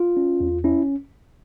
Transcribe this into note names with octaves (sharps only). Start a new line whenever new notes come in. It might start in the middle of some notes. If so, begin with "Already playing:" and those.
Already playing: F4
C#4
E2
C#4 E4